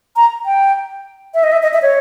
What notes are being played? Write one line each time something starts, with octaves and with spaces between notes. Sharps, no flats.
A#5
G5
E5
D#5
E5
D#5
E5
C#5